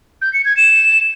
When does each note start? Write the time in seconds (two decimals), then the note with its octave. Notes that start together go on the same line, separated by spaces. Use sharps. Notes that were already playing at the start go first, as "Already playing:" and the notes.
0.22 G6
0.33 C#7
0.45 G#6
0.57 E7